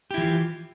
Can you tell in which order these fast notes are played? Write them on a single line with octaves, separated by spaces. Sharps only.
G4 E4 E3 F4